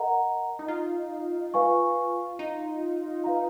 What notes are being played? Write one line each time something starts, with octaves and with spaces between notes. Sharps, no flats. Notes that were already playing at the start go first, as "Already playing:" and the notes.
Already playing: A#4 D#5 F#5 A#5
D#4
F4
B4 F5 G#5 C#6
D#4
B4 F5 A#5